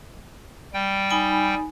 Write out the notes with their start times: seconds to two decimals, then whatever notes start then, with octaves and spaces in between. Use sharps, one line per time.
0.74 G3 G5
1.10 D#4 G#5 B5